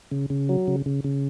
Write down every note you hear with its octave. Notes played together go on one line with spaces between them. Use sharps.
C#3
C#3
F#3
C#3
C#3
C#3